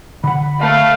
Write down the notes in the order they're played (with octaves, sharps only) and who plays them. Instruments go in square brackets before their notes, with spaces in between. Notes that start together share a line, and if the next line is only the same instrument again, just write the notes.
[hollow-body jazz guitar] D3 F#5 [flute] B5
[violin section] A3 [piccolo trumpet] F5